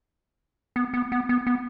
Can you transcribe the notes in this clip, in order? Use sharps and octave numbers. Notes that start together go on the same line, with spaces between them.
B3
B3
B3
B3
B3